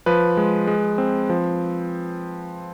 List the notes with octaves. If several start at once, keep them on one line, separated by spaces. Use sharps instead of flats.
F3 B4
G#3
G#3
C4
F3